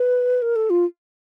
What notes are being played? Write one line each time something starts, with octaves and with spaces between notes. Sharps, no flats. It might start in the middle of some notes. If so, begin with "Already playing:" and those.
Already playing: B4
A#4
A4
F4